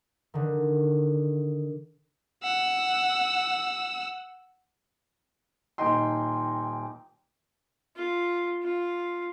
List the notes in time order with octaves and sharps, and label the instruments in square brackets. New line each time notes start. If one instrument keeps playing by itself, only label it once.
[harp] D3 D#3
[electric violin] F#5 E6
[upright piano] D#1 D#4 D#5 G5 C6
[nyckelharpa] F4
F4